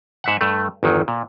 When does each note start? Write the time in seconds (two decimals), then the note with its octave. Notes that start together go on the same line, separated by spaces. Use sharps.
0.24 G#2 E5 F#5
0.41 G2 A3
0.83 G1 E2 D#3 F#3
1.08 A#2